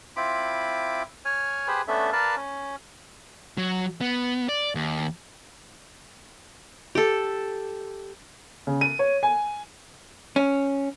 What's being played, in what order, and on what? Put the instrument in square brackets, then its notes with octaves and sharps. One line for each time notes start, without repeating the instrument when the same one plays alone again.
[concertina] C4 E4 F4 B5 D6
C#5 G#5 F6
G4 G#4 B4 C5
A3 B3 C#4 D4 A4 E5
A#4 B4 D5 F5 A5
C#4
[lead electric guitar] F#3
B3
D5
D#2
[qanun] G4 A4
[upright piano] C#3
D#7
C#5
G#5
[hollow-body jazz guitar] C#4